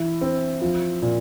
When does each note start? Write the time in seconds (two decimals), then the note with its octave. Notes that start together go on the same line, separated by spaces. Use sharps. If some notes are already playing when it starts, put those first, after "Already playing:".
Already playing: E3 E4
0.21 C4
0.62 F3
1.02 A#2